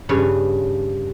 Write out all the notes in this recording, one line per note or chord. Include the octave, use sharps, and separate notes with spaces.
G2 C#3 B4 C#5